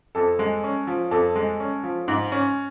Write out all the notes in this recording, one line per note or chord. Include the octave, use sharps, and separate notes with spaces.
F2 A4
G#3
C#4
F3
F2 A4
G#3
C#4
F3
G#2
C#4